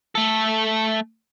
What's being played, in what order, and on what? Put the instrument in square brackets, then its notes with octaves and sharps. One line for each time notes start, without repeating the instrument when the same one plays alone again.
[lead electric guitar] A3 A4